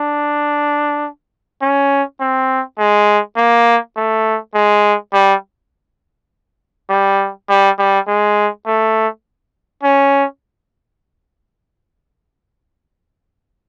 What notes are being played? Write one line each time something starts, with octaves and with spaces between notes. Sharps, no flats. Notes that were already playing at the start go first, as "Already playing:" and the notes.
Already playing: D4
C#4
C4
G#3
A#3
A3
G#3
G3
G3
G3
G3
G#3
A3
C#4